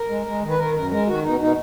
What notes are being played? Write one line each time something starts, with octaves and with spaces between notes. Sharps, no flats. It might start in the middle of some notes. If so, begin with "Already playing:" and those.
Already playing: A#4
G#3
G#3
D#3
B4
D#3 A#4
F#2 A#4
G#3 A#4
D#3 F#4
B2 D#4
B2 D#4